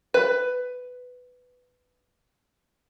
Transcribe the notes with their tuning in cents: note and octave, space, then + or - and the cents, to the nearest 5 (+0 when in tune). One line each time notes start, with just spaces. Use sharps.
B4 +10